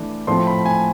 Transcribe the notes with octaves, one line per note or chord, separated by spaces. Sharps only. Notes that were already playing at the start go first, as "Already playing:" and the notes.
Already playing: E3 A3 D4
A2 F3 A3 C4 C6
B5
G#5